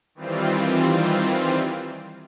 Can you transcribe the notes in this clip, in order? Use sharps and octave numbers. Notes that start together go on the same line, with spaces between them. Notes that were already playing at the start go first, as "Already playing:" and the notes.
D#3 E3 G3 C4 F4